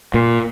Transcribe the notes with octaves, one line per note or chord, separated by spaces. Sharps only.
A#2